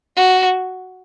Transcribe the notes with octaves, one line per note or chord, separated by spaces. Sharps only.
F#4